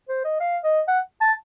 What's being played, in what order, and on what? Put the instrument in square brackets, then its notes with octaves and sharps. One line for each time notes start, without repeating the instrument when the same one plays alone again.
[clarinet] C5
D#5
F5
D#5
F#5
A5